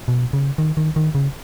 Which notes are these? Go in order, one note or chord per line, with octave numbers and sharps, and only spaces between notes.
B2
C#3
D#3
D#3
D#3
C#3